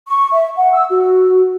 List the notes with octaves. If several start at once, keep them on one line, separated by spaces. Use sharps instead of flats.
C#6
E5
F#5
E6
F#4